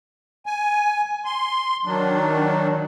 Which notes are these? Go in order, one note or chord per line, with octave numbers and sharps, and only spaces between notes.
G#5
C6
D#3 F#3 D4